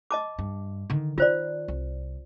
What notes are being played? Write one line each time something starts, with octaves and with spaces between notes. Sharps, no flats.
D#5 A5 D6
G2
D3 D#3
D#3 F4 C5 D5
C2